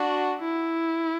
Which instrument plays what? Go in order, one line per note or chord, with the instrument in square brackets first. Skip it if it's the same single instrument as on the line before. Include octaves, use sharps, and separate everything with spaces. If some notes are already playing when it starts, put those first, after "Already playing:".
Already playing: [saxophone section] D4 F#4
[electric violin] E4